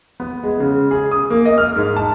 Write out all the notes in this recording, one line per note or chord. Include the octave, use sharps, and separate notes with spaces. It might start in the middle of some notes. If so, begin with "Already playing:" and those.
B3
G#3
C#3
G#4
D#6
A#3
D#5
F6
G#2
A5